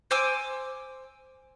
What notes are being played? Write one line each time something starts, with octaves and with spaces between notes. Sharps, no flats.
C5 G#5 D6 E6